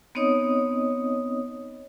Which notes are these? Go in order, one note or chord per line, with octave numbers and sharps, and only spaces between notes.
B3 C4 D#4 C#5 D#5 D#6